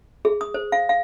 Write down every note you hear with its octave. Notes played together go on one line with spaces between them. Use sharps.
G#4
D#6
C5
F5
F5